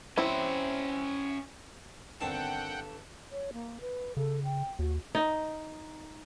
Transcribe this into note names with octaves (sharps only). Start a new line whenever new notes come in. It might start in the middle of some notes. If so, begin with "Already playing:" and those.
C4 C#4 E4 E5
G1 D#3 C4 D4 A4 F#5 G5 A5
C#5
A#3
B4
C#3 A4
G5
D#2 F#4
D#4